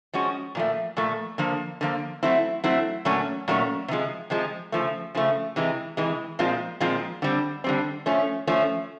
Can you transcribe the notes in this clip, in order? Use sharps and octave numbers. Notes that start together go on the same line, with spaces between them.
F3 G#3 C#4 F#4
A#2 F3 A3
A#2 F3 A3
D3 F3 A#3
D3 F3 A#3
F#3 A3 C4 E4
F#3 A3 C4 E4
A#2 F#3 A3 C#4
A#2 F#3 A3 C#4
C3 F3 G#3
C3 F3 G#3
C#3 F3 A3
C#3 F3 A3
C3 E3 G#3
C3 E3 G#3
A#2 F3 G#3 C4 F4
A#2 F3 G#3 C4 F4
D3 G3 C4
D3 G3 C4
F3 A3 C#4
F3 A3 C#4